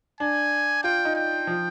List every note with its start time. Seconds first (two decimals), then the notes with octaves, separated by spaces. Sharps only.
0.20 D4 G#5
0.84 F4 G5
1.05 D#4
1.16 G5
1.47 F3